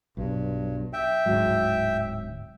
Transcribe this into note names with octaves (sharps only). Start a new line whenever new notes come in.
B1 G2
E5 G5
D1 G#2 F#3